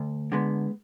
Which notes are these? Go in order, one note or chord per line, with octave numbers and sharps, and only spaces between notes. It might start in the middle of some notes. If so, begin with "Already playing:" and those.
Already playing: D2
D3 G#3 B3